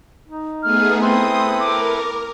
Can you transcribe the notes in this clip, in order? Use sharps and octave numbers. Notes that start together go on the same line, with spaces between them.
D#4
A3 B3 G#4 F6
C4 E4 A4 B4 C6 D#6
A#4 D6